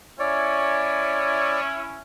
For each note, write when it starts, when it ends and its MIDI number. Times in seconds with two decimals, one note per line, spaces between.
0.19 2.00 61
0.19 2.00 64
0.19 1.60 73
0.19 1.60 74